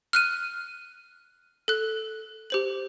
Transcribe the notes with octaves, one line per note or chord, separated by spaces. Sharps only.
F6 F#6 D#7
A4 F#6
G4 C5 F#7